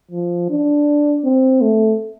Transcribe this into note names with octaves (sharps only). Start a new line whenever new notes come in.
F3
D4
C4
A3